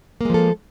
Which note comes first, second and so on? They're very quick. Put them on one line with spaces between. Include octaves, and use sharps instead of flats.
A#3 G#3 F3 A4